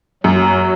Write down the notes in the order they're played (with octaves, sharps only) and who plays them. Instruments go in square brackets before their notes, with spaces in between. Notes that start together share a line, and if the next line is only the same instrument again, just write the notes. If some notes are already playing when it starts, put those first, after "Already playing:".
[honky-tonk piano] F#2 [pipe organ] F#3